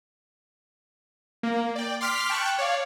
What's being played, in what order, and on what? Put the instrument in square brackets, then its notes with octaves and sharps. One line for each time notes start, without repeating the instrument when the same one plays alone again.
[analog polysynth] A#3
D5 G5
C6 D6 F6 B6
G5 A5 C#6 F#6
C#5 D5 F5